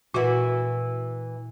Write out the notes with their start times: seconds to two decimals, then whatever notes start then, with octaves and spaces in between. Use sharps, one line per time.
0.14 A#2 E3 F#4